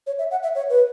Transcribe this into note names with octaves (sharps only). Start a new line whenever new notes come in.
C#5
E5
F#5
E5
C#5
B4